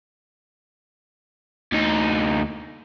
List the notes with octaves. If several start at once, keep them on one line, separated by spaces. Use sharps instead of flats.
D2 D#4